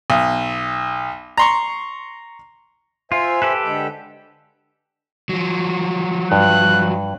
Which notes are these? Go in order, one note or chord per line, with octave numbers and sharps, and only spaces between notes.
B1
A#5 C6 C#6
F4 C5 E5 G#5
G4 A4 B4
D3 G#3 G5
F3 F#3
G2 F#6